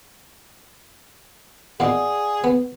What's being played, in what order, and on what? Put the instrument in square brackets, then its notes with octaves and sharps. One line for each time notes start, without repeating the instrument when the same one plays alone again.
[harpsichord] A#2 A#3 D#4 [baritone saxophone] G#4 [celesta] D5 F#5
[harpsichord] B3